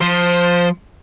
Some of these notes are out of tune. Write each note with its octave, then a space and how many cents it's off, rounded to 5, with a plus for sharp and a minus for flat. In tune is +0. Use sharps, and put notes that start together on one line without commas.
F3 +15 C5 +0